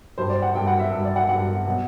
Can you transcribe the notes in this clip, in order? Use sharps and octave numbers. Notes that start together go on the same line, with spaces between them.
G2 F#3 C5
D5
F#5
G2 F#3 G5
F#5
E5
G2 F#3
D5
F#5
G2 F#3 F#5
B2 F#3